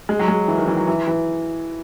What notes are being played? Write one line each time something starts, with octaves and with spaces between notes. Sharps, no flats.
G#3
F#3
G#3
E3
D#3
E3
F#3
E3
E3